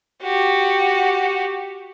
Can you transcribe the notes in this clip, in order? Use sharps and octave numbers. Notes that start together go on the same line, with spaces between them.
F#4 G4